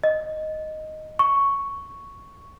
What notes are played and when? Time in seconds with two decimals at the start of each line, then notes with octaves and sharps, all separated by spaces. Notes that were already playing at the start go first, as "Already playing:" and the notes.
0.04 D#5
1.19 C#6